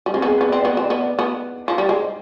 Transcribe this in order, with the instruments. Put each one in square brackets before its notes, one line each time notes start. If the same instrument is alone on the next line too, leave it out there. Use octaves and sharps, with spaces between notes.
[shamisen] G3
[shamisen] G#3 [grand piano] C4
[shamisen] B3
[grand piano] G#4
[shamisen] B3 [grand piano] B4
[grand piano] D5
[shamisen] C4
[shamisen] B3 [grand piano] D5
[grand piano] D#5
[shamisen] C4
[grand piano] D5
[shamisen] B3
[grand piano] D5
[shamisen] B3
F3
G3
[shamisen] G#3 [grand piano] D5
[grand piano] C5